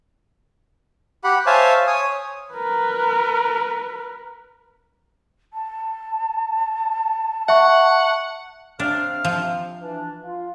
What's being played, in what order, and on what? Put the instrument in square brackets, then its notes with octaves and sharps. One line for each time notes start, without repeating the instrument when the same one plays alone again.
[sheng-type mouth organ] G4 F#5 B5
C5 C#5 E5 F5 G#5 A5
C#5 G#5 D#6
[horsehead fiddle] A#4 B4
[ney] A5
[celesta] E5 C#6 [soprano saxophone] F#5
[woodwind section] C3 F5 F6 [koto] D4
[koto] F3
[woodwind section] E3 D4
F4